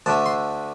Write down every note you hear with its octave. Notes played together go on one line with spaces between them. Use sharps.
D2 D3 A3 A5
C6